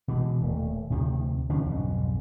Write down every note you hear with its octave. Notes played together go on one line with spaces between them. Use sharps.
B2 E3 G#3
D#1 A3
D2 C3 D#3 F3
D3 E3 C#4
B1 F2 G#2 B2